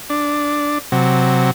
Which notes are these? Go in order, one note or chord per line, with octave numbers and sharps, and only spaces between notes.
D4
C3 F#3